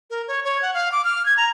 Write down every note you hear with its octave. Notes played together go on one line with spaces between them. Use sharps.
A#4
C#5
C#5
F#5
F5
D6
F6
G#6
A#5